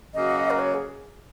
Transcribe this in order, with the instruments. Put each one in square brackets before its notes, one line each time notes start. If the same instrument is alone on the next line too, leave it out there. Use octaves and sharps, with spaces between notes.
[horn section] C#3 F#3 A#3 F#4 [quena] D#5
[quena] A#4
C#5
G#4